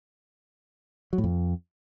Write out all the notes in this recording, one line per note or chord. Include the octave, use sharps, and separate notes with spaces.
F#3
A2
F2